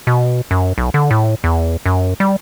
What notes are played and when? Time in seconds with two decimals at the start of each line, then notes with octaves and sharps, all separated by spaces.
0.07 B2
0.51 F#2
0.78 B1
0.94 D3
1.10 A2
1.44 E2
1.86 F#2
2.20 G3